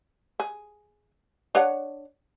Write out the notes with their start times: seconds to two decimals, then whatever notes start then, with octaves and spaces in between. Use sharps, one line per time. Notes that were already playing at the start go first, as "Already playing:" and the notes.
0.40 G#4
1.55 D4 C#5 F#5